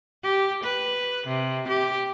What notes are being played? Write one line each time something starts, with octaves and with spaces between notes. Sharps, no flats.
G4
B4
C3
G4